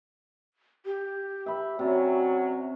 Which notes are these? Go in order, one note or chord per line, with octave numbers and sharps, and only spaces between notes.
G4
E5 B5
C3 F#3 C#4 D5